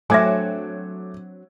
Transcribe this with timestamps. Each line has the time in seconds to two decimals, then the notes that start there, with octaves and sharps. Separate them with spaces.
0.10 F#3 A3 C4 D4 E5 G#5 D6 G#6